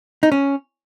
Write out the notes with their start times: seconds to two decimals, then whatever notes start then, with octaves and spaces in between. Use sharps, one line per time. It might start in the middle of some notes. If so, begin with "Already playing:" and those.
0.23 D#4
0.32 C#4